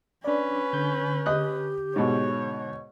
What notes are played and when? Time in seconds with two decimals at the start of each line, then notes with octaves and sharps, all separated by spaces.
0.24 C#4 D4 B4 D5
0.73 D3 G6
1.26 G4 D#5 F#6
1.96 G#2 B2 C#5